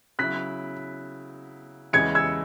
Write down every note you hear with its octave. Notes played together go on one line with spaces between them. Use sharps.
C#3 F#3 E4 F#6 B6
E2 C#3 G#3 E4 G#6 C#7
E6 G#6